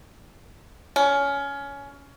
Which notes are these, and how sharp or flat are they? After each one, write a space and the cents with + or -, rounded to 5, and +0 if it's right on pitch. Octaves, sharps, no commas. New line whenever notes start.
C#4 +20